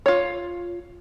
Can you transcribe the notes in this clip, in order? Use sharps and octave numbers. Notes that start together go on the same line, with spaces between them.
F4 C#5